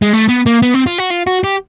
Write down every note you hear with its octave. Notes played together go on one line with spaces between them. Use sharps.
G#3
A3
B3
A#3
B3
C4
F4
F#4
F4
F#4
G4